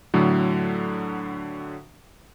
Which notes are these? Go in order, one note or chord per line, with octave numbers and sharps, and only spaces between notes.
A2 D3 F#3